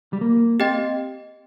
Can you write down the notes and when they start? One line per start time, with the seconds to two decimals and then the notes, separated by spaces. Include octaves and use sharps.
0.13 G3
0.21 A#3
0.60 C4 G4 D#5 G5